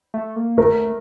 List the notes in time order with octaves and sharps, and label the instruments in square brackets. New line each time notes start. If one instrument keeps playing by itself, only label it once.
[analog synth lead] A3
A#3
[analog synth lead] A3 [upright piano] A#4